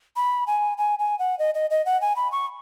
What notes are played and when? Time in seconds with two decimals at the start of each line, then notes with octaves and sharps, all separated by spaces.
0.16 B5
0.47 G#5
0.78 G#5
0.99 G#5
1.19 F#5
1.39 D#5
1.55 D#5
1.70 D#5
1.86 F#5
2.01 G#5
2.16 B5
2.32 C#6